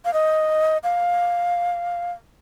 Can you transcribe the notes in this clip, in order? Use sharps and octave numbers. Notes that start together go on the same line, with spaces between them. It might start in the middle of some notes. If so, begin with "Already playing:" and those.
F5
D#5
F5